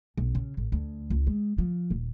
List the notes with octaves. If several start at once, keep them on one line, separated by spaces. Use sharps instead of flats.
B1
C#3
A1
D2
C#2
G#3
F3
D#1